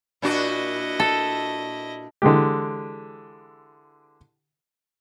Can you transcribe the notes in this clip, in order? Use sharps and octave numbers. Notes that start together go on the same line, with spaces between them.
A#2 D4 E4 F#4 D#5
A4
D3 E3 G#3 G4